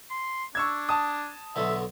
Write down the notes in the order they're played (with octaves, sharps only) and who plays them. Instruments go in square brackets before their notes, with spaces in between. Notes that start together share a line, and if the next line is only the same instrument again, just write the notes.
[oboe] C6
[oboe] D4 [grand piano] C#6 E6 G#6
[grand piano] A5 D#6
[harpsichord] B1 D3 [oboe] E5